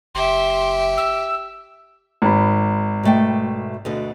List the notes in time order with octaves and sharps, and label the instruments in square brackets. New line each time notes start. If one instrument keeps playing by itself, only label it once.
[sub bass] F#1 [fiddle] G4 E5 [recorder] C6
[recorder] E6
[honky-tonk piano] G#1 B5
[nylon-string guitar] B2 A3 G5
D2 B2 D3